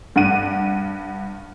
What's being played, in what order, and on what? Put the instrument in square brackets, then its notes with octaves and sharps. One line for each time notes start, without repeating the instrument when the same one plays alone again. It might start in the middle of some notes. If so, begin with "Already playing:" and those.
[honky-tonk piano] G2 F#5 D#7